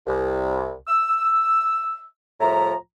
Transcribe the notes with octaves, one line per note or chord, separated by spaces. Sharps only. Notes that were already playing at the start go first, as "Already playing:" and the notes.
C2
E6
C2 A2 F3 E5 A#5